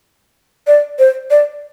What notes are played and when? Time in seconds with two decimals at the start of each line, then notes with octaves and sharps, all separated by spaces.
0.67 D5
0.99 C5
1.30 D5